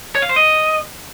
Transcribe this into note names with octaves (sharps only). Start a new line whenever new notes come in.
C#5
F5
C5
D#5